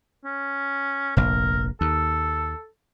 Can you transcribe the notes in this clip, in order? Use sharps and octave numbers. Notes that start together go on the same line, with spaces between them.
C#4
F1 A#1 A#4
D#2 A4